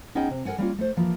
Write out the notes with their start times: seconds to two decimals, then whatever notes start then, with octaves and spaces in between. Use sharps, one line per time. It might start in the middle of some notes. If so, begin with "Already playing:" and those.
0.15 B3 C#4 D#4 G#4 D#5 G5
0.30 C3
0.45 A4 A#4 D5 F#5 G#5
0.58 G3 A#3 C#4 F4
0.78 A3 C5
0.97 E3 F3 A#3